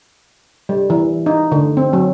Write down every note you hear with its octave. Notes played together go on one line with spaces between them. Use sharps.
G3
E3
D#4
D3
C4
F#3